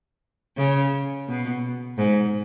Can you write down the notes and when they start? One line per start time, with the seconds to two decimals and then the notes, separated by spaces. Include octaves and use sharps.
0.58 C#3
1.28 B2
1.98 G#2